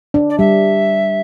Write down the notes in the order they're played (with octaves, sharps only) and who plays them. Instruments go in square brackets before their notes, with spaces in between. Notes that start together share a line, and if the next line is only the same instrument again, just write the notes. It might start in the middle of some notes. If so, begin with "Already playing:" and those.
[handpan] D4
[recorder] D5
[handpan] G3 [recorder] E5